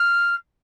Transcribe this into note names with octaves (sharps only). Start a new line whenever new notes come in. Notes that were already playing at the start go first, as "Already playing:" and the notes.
Already playing: F6